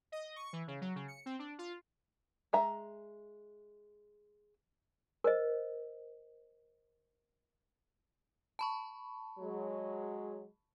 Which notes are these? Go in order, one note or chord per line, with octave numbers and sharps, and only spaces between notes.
D#5
C#6
E3
C#3
F#3
C#3
C#7
C4
D4
F4
G#3 E5 A#5
A#4 C5 D#5
A5 B5 C#6
F#3 G#3